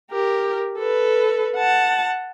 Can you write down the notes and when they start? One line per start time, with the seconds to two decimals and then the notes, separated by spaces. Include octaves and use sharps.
0.11 G4 A#4
0.78 A4 B4
1.56 F#5 A5